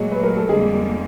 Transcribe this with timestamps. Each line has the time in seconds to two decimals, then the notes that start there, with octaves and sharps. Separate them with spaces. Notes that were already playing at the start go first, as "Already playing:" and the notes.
Already playing: A#2 F#3 G#3 A3 G#4
0.11 B4
0.23 A#4
0.37 A4
0.49 F2 D3 G3 G#3 A#3 G#4